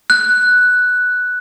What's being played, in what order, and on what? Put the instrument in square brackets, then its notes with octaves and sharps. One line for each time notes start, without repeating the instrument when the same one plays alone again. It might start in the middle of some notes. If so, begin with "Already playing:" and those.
[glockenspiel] F#6